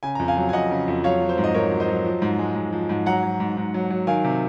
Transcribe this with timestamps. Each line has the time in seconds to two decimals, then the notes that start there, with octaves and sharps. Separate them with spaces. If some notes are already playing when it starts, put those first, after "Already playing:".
0.03 C#3 G#5
0.15 F2 A#5
0.28 F5 G#5
0.37 F#3
0.49 G#5
0.53 F2 D#5 F#5
0.71 C#3
0.88 F2
1.04 F#3 C#5 F5
1.21 F#3
1.29 C5
1.38 G#2
1.44 D#5
1.54 G#2 A#4 C#5
1.72 F#3
1.80 C5 D#5
1.88 F#3
2.05 F3
2.22 G#2
2.39 G#3
2.55 G#2
2.73 F3
2.89 G#2
3.06 F#3 F#5 A#5
3.23 F#3
3.40 G#2
3.57 G#2
3.74 F#3
3.90 F#3
4.07 D#3 F5 G#5
4.24 C3